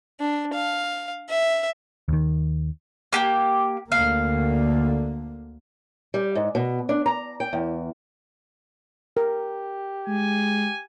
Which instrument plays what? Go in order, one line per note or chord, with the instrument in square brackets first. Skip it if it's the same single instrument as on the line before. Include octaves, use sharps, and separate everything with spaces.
[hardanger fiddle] D4
F5
E5
[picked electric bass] D#2 D#3
[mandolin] A#3 G4
[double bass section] D2 D3 A#3 [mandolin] F5
[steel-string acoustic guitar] G3
G#2
B2
D4
A#5
G5
E2
[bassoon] G4 [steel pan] A#4
[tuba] G#3 [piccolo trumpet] G#5